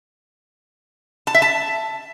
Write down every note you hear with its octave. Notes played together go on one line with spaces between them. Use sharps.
A5
E5
A5